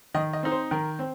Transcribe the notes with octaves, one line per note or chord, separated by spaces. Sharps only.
D#3 D#5
D#5
C4 D#4
C5
D#3 A#4
C4